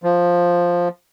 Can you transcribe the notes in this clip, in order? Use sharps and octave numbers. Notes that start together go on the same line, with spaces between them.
F3